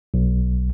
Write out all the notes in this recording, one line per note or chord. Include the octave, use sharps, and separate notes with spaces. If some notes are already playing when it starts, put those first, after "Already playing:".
B1